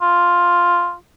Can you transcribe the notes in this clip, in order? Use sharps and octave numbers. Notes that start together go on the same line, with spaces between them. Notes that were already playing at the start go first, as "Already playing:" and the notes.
F4